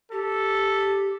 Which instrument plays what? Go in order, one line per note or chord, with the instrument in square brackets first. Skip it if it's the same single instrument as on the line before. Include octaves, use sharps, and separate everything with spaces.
[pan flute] G4 [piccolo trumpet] A4